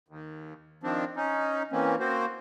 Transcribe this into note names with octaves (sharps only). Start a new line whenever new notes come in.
D#2
D#3 F3 C4 D4
C#4 D#4
E3 A#3 C4 C#4
A#3 C4 F#4 C5